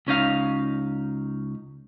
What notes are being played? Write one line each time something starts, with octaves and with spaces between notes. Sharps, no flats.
C#2 C#4 D#4 F5